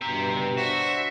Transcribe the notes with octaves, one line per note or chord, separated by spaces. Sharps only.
G2 B2 G4 E5 A#5
D4 F#4 C5 E5